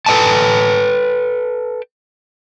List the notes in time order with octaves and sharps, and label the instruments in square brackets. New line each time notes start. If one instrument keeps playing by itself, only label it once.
[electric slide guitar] A4 B4 D#5 G5 A5